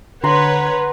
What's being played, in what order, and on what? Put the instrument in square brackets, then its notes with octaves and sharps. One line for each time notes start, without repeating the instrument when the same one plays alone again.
[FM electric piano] D3 [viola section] B4 [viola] C#5 F#5 [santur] A#5 C6